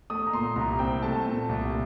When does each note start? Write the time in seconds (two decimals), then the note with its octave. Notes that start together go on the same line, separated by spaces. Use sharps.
0.10 A3 D#6
0.27 A#5
0.33 A#2 C6
0.56 C2 A#5
0.79 C4 G5
1.03 A3 A5
1.26 A#2
1.49 C2